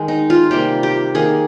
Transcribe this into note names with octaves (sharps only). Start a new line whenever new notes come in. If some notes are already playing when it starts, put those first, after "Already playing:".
Already playing: D#3 G#3
D#4
F4
C3 G3 A#3 G4
G4
D#3 A#3 G#4